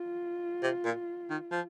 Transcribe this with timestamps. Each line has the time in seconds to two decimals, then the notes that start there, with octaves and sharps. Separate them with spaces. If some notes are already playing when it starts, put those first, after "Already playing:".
Already playing: F4
0.63 C3
0.85 A#2
1.30 D#3
1.51 F3